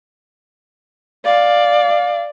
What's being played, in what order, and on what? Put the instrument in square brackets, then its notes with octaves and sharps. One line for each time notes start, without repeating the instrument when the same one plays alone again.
[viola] D5 [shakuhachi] F5